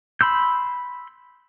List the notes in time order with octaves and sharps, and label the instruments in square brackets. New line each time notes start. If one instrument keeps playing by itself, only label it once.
[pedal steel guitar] B5 C6 E6 G6